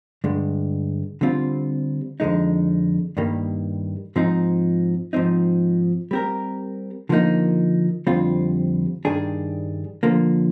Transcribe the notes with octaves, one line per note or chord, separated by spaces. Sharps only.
G2 D3 G#3
D3 G3 C4 F4
F2 D3 G#3 D#4
G2 D#3 G3 A#3
G#2 F3 C4 D#4
G#2 F3 C4 D#4
G3 C4 G4 A#4
D3 F3 A#3 D#4
F2 D3 G3 C4 F4
G2 D#3 G3 D4 G#4
D3 F3 A#3